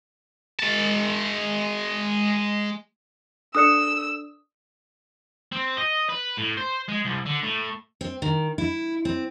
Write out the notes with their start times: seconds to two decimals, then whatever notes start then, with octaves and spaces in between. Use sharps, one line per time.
0.60 G#3 A5
3.55 D4 A4 D5 D#6 E6 F#6 C#7
5.52 C4
5.77 D#5
6.09 B4
6.37 A2
6.57 C5
6.89 G#3
7.05 C2
7.26 D3
7.43 A2
8.01 C4
8.22 D#3
8.58 E4
9.05 C4